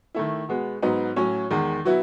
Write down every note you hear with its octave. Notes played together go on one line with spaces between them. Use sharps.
D#3 A3 E4
B2 G#3 B3
G#2 F#3 B3 D#4
A2 F#3 C#4
E2 D#3 G#3
B2 F#3 B3 E4